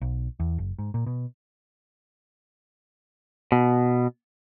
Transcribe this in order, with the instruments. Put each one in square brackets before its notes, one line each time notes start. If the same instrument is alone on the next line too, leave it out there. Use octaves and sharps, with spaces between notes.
[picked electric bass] B1
E2
F#1
G#2
A#2
B2
[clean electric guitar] B2